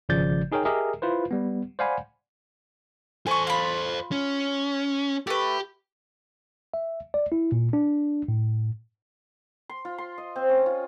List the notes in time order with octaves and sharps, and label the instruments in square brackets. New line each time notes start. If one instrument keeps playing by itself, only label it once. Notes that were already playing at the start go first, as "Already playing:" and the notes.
[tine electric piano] G#1 C#3 F3 D5 G6 A6
D#4 G#4 A#4 C#5 G5
G4 G#4 A#4 D#5 E5
E4 F4 B4 C5
G3 B3
C5 D5 F5 F#5 G#5 B5
[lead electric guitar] A4 C5 [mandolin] G#5 C#6
[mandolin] F4 B5
[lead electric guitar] C#4
[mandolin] A3 B4 [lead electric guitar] G4
[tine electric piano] E5
D5
E4
A#2
D4
A2
[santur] C6
F4
C6
D#5
C4
C#4
F4